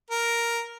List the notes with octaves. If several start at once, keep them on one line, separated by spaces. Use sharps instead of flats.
A#4